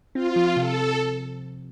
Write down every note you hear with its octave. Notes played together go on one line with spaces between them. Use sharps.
C4 F4
F3
C3 A4